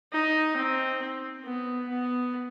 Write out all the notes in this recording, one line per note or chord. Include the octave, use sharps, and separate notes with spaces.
D#4
C4
B3
B3